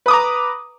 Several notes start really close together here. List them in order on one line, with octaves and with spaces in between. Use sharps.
B4 D#6 D6 A#5